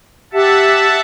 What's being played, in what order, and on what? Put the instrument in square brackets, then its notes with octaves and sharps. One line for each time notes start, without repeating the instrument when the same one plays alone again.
[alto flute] G4 [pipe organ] E5 F#5 A5